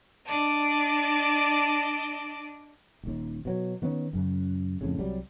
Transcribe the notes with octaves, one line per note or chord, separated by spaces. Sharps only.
D4 D5 D#5 A5
D#1 D#2
B2 F#3
D#3 B3 C#4
F#2 C#3
F2 A2 C#3
C2 F#3 G3